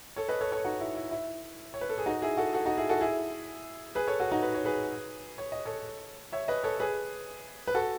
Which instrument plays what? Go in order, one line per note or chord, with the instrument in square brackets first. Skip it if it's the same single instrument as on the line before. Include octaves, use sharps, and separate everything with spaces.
[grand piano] A4 C#5
B4 D#5
A4 C#5
A4 C#5
D#4 F#4
E4
E4
E4
C#5
B4
A4
G#4
D#4 F#4
E4 G#4
F#4 A4
F#4 A4
D#4 F#4
E4 G#4
F#4 A4
E4 G#4
G#4 B4
A4 C#5
F#4 A4
D#4 F#4
B4
C#5
G#4 B4
C#5
D#5
A4 C#5
C#5 E5
B4 D#5
A4 C#5
G#4 B4
B4
F#4 A4